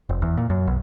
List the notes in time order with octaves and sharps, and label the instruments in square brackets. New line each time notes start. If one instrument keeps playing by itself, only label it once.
[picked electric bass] F1
E2
A#2
F#2
B1